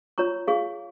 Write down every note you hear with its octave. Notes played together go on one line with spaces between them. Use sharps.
F4 C#5 A#5 C#6
G#4 F5 C#6